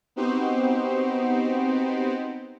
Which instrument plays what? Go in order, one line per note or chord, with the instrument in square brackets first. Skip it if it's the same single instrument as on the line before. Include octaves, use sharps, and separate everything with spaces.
[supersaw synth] B3 C4 D#4 F#4 G4 C5